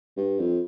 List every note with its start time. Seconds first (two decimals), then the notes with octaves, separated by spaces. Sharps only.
0.17 G2
0.39 F2